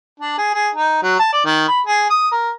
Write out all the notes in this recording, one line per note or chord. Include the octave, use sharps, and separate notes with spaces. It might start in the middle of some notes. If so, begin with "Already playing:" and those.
D4
G#4
G#4
D#4
F#3
A5
D5
D#3
B5
G#4
D#6
A#4